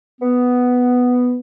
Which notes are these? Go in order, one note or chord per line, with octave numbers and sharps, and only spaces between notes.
B3